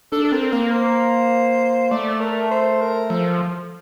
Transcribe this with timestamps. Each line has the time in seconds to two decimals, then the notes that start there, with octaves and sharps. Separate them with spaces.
0.12 D4 A4
0.24 A4
0.32 C4 A#4
0.52 A#3 A#4
0.71 C5
1.91 A3 D5
2.20 A#4
2.51 C5
2.81 A#4
3.10 F3 A4